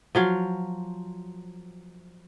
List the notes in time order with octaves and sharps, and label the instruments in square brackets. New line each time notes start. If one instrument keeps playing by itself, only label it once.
[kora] F3 F#3 F5